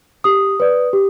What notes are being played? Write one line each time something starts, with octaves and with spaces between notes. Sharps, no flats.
G4 D#6
B4 D5
G4